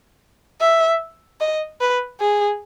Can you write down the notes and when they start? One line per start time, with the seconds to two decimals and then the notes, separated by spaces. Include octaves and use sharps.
0.61 E5
1.40 D#5
1.81 B4
2.20 G#4